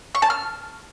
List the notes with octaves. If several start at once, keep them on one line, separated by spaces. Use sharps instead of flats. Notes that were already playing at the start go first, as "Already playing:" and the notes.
C#6
A5
F6